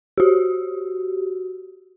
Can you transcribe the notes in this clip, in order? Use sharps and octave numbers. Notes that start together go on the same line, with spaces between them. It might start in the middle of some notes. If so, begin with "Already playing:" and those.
F#4 G4